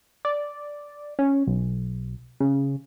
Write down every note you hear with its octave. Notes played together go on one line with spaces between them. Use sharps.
D5
C#4
B1
C#3